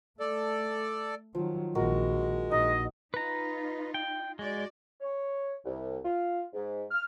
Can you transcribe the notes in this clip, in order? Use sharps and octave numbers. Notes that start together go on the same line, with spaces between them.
A3 A4 D5
D#3 F3 F#3
A#1 D#3 G#3 F#4 A#4
A#1 D#4 D#5
D#4 F4 B4 A#5
G5
G#3 F#4 D5
C#5
C2
F4
G#2
F6